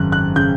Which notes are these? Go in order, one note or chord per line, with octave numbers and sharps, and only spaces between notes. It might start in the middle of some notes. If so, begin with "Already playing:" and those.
Already playing: G#1 F#2 C#3 F#6
F#6
C#3 G6